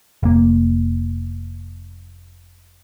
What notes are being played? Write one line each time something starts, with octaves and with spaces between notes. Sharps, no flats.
F1 A#3